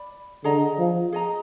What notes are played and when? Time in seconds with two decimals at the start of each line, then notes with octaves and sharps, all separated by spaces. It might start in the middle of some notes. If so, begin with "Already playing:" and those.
Already playing: D5 B5
0.44 D3 G#4 D#5 A#5
0.79 F3
1.12 G#4 D#5 A#5